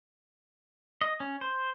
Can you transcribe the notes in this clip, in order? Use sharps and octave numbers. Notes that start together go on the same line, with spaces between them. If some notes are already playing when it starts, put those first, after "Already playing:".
D#5
C#4
C5